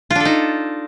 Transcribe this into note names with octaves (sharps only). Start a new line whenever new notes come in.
D4 D#4 F4 A4